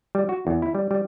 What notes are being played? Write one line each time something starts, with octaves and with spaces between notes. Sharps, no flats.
G3
F#4
E2
E4
G3
G3